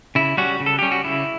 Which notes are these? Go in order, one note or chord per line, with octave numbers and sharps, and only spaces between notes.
C#3 E4
G3 C#4 F#4
C#3
A4
G3 C#4 G4
F#4
C#3 E4